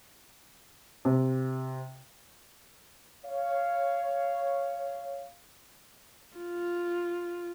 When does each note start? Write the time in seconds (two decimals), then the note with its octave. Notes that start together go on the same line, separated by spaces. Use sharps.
1.05 C3
3.26 C#5 F5
6.37 F4